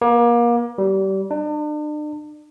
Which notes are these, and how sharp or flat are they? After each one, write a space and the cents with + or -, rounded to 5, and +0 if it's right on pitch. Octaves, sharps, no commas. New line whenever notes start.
A#3 +30
G3 -30
D4 +40